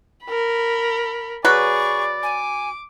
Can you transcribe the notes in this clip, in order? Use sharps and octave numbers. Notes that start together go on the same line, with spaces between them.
A#4 B5
F#3 G#4 B4 D5 C#6
G#5 D6